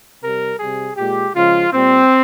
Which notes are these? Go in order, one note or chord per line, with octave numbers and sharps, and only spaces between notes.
C3 G3 A#4
C3 G3 G#4
A#2 G#3 G4
C#3 F3 G#3 F4
A#2 G3 C4